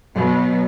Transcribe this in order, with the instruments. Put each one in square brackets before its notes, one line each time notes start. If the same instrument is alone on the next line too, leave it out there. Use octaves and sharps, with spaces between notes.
[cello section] B2 F#3 B3